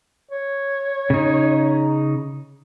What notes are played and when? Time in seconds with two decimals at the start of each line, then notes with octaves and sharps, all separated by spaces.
0.31 C#5
1.10 C#3 D#4